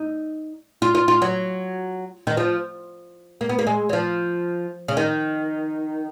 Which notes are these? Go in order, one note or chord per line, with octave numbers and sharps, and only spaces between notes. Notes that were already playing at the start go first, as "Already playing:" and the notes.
Already playing: D#4
F4
F4
F4
F#3
D#3
F3
A#3
B3
A#3
G#3
F#3
F3
C#3
D#3